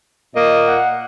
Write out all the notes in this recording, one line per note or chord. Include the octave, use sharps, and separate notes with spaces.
A#2 A#3 D#5
F#5